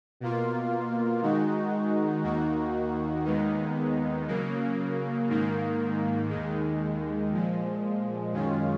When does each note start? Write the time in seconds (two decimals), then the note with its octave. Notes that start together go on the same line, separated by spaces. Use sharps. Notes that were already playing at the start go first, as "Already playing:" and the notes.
0.20 B2 A#3 F4
1.22 D#3 G#3 D#4 F#4
2.24 D#2 D#3 A#3 D#4 F#4
3.25 D#2 D#3 G#3 B3 D#4
4.27 C#3 F#3 A#3
5.29 G#2 D#3 A#3
6.29 D#2 D#3 G#3
7.31 A#2 F3 G#3
8.33 F#2 D#3 G#3 C#4 F4